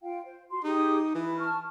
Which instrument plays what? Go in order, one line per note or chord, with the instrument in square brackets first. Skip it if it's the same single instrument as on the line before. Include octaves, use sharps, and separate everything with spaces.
[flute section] F4 F5 G5
C5
F#4 C6
[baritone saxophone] D#4 [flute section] G4 G#4 D#6
[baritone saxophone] E3 [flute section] B4
[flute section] A5 C#6 F6